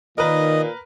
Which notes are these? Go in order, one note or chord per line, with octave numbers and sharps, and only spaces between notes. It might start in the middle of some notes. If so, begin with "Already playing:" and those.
A#2 D#3 A#4 B4 D#5